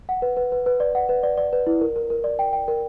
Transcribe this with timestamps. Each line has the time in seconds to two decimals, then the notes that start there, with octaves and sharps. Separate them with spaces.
0.09 F#5
0.22 B4
0.37 B4
0.52 B4
0.66 B4
0.80 D5
0.95 F#5
1.09 B4
1.23 D5
1.37 D5
1.53 B4
1.67 E4
1.81 A#4
1.96 A#4
2.10 A#4
2.24 D5
2.39 G5
2.53 G5
2.68 A#4